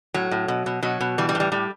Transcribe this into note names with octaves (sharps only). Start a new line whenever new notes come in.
A2 F#3
A2
B2
B2
B2 F#3
B2
E3 G3
G3
A2
G3
A2 G3